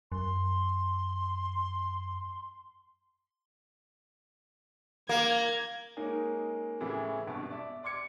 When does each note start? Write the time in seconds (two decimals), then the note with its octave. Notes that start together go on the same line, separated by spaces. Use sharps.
0.12 F#2 C6
5.09 A#3 G#6
5.97 G#3 A#3 C#4 D#4
6.81 A2 C#3 E3 E4 G#4
7.27 G#1 G2 B2 A5
7.50 D5 E5
7.83 D5 C6 D6 G#6 C#7